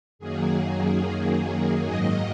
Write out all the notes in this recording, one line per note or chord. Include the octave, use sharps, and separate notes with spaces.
F#2 D#3 F#3 A#3 G#4
G#4
G#2 D#3 F#3 A#3 D#5